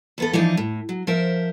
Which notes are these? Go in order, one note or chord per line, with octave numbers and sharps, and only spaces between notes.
E2 B3 A4
E3 F3 D4 D#4 D#5
A2
F#3
F3 A#4 C5 E5